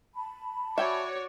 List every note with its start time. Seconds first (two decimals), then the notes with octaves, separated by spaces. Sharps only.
0.14 A5 B5
0.78 F#4 C#5 D5 E5 G5 G#5